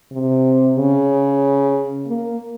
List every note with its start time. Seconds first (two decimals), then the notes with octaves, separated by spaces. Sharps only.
0.12 C3
0.77 C#3
2.07 A#3